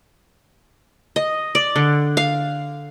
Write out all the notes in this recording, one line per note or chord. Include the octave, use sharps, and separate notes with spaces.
D#5
D5
D3
F5